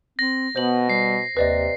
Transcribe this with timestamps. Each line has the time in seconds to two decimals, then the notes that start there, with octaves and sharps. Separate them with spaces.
0.19 C4 A#6
0.56 B2 B3 C5 F#7
0.89 G3 C7
1.37 D#2 C3 B4 D5 D#5